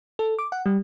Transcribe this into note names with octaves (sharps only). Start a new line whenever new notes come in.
A4
D6
F#5
G3